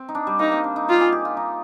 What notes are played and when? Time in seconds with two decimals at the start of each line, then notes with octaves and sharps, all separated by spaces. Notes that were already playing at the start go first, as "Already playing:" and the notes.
Already playing: C4
0.09 D#4
0.15 D4
0.27 G3
0.39 A#3 D#4
0.52 C4
0.64 D4
0.76 D#4
0.88 F4 G4
1.01 G#4
1.12 G4
1.25 F4
1.37 D#4